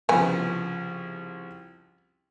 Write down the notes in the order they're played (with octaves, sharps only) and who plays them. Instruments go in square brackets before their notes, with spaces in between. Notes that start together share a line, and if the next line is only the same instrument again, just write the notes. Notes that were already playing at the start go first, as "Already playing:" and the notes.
[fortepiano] C2 C#3 F3 [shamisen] B3 G#5